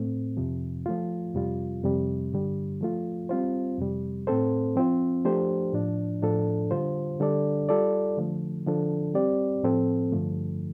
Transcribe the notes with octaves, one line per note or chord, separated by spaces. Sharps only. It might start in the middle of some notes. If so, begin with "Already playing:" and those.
Already playing: A2 A3 C4
F2 C3 F3
F3 A3 F4
F2 C3 G3 F4
F2 C3 G3
G2 D3 G3
F3 A3 F4
G3 C4 F4 C5
F2 C3 G3
A2 A3 C4 A4 C5
F3 C4 F4 C5
F3 A3 D4 G4 C5
A2 F3 D4
A2 F3 D4 A4
D3 G3 F4 C5
D3 G3 D4 A4 D5
G3 F4 A4 D5
D3 F3 A3
D3 F3 D4 A4
G3 C4 G4 D5
A2 F3 C4 A4
G2 D3 F3 A3